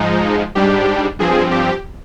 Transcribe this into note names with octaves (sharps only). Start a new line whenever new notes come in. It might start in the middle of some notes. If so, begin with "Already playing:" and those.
Already playing: G#2 F3 G#3 D#4
G#2 G3 D4 G4
G2 F3 C4 G#4
G4